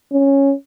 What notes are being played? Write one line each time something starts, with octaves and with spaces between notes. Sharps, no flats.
C#4